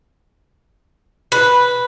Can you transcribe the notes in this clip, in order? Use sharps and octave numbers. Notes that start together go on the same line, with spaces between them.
B4